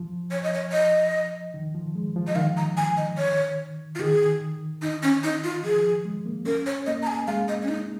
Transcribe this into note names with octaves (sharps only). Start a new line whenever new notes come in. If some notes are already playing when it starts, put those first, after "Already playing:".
Already playing: F3
C#5
D#5
C#5
D#5
D#3
F3
G#3
F3
D#5
D#3 F5
A#5
G#5
D#5
C#5
F4
D#3 G#4
D#4
C#4
D#4
F4
F3 G#4
G#3
A#3
C#4 A#4
C#5
A#3 D#5
A#5
G#5
G#3 F5
D#5
C#4
D#4